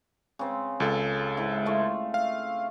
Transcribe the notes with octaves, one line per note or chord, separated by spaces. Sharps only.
C#3 C4
C#2 A4
G#2 E4
A3 F4
F5